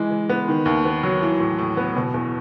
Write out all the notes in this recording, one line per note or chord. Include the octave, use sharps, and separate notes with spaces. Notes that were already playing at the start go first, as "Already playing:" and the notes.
Already playing: E3 G#3
E3
B3
D#3
D#2
B3
F#3
E3
A2
A2
B3
B2
E2